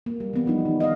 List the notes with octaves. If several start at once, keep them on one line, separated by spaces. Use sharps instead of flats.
A#3
G3
E3 B3
F3 G3 D#4
D#3
D#5 F5